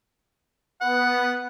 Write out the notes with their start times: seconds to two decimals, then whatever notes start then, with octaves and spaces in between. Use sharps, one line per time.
0.81 B3 F#5